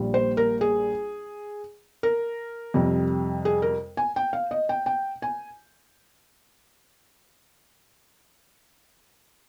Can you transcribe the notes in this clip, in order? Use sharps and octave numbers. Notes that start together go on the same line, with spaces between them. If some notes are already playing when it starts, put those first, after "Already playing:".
Already playing: A#1 A#2 G3
C5
A#4
G#4
A#4
F2 C3 G3
G#4
A#4
G#5
G5
F5
D#5
G5
G5
G#5